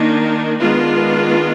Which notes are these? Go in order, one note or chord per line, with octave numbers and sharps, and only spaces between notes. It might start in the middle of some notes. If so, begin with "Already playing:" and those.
Already playing: D#3 A#3 D4 D#4
D#3 G#3 B3 D4 F4